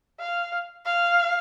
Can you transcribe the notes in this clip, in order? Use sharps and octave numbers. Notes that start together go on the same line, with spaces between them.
F5
F5